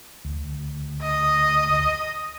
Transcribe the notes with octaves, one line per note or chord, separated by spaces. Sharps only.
D2
D#5